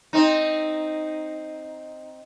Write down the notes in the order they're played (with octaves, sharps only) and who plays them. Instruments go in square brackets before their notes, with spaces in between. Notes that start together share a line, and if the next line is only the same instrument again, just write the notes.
[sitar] C4 D#4